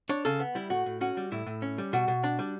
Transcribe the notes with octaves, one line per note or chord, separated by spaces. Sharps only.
D4 C#5
C#3 A4
B3
G3 E4
A2 F#4
A2
C#4 F#4
G3
A2 E4
A2
C#4
G3
B2 F#4
B2
D4
G3